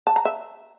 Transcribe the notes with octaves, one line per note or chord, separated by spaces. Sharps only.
A5
A#5
E5